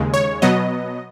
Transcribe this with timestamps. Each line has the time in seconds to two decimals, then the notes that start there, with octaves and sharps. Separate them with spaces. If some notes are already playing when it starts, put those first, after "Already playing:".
Already playing: D#2 C#3 G#3
0.14 C#5
0.42 B2 F#3 B3 D#5